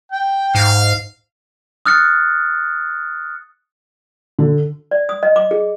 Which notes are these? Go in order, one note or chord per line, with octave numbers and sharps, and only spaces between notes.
G5
G#2 F5
D#6 F6 F#6 A6 C#7
D3
D5
D#6
D#5
D6
G#4